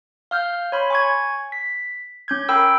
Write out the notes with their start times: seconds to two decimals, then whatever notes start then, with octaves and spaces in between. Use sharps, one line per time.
0.31 F5 F6 G6
0.72 C#5 B5 C6
0.90 G#5 C#6 G#6
1.52 B6
2.28 C#4 G6 G#6
2.49 A#4 G5 B5 E6 G6